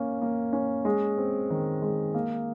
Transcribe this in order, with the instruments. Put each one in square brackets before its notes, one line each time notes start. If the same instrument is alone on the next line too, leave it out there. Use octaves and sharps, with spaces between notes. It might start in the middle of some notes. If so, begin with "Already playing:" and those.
Already playing: [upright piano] A#3 C#4
A#3
C#4
G#3
C4
D#3
G#3
A#3